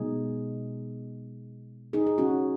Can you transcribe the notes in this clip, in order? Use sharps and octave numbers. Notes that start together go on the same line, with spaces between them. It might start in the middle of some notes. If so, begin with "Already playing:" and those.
Already playing: B2 G#3 D#4 G#4
D#4 G#4
G#4
C#4 F#4